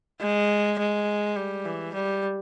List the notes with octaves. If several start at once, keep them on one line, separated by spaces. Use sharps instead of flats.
G#3
G#3
G3
E3
G3